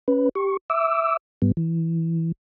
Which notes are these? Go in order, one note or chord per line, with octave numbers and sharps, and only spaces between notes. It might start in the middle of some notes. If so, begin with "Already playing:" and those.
C#4 B4
G4 C#6
E5 D6 E6
G#2 G3 B3
E3